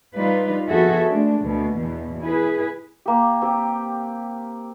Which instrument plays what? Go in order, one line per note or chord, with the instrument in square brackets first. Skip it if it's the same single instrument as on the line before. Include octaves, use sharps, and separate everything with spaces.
[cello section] G3 D#4 F4 B4
F2 B3 F#4 G#4 A4 E5
G#3 A3 D4
D2 B2
E2 B2
E4 G#4 B4
[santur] A#3 G4
C4 G4